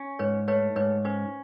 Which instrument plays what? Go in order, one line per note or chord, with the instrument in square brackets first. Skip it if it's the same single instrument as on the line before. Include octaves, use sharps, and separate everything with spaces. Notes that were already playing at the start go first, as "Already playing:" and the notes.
Already playing: [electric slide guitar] C#4
[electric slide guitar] G#2 [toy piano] B4 C#5
[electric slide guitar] A3 [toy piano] B4 C#5
[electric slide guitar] G#2 [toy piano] B4 C#5
[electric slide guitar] C#4 [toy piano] C5